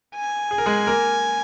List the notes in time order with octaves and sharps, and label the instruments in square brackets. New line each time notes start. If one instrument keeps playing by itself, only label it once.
[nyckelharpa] G#5
[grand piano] G#4
A#4
G#3 G#4
A#3 A#4